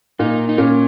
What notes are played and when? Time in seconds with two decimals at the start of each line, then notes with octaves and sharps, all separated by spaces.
0.19 A#2 D#4
0.49 D#4
0.58 A#2 C#4